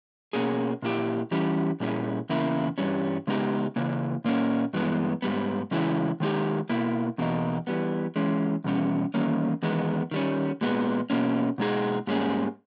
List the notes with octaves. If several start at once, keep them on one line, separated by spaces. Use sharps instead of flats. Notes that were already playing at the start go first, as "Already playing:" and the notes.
B2 A#3 C#4 G#4
A#2 A#3 E4 G4
E3 G3 C#4 E4 G4
A#2 G3 C#4 E4 G#4
E2 C#3 A#3 E4
G2 E3 G3 C#4
C#3 G#3 B3 D#4 G4
C#3 E3 A#3
A#2 A#3 C#4
G2 E3 G#3 B3
G#2 G3 B3
C#3 E3 G#3 C#4 E4
D#3 G#3 D#4 G4
B2 A#3 E4
E2 B2 A#3 D#4
E3 G3 B3
E3 G#3 C#4
E2 B2 G3 C#4
E2 D#3 G3 A#3 C#4
E2 D#3 G#3 B3
D#3 G3 C#4
A#2 G#3 B3
B2 A#3 C#4
B2 G#3 D#4 G#4
G#2 G3 A#3 C#4 G#4